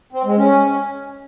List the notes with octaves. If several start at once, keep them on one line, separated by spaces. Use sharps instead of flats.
C4
G#3
C#4